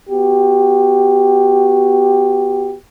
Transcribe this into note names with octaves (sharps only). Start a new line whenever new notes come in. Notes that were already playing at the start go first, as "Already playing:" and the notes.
B3 F#4 G4